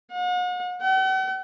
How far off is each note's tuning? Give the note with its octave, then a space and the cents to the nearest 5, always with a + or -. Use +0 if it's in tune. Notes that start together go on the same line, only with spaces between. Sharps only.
F#5 -40
F#5 +45